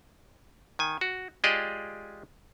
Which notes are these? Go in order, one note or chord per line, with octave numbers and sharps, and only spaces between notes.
D#3 G#5
F#4
G#3 F4 G4 G#4 D5 D#5